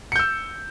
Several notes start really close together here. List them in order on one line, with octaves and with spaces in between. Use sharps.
C#7 G6 E6